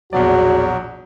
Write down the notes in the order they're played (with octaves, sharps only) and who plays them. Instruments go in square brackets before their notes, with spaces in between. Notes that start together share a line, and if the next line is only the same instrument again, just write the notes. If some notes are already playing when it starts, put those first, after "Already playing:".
[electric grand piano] A#1 B2 D5 [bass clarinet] E2 [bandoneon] F#3 [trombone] F#4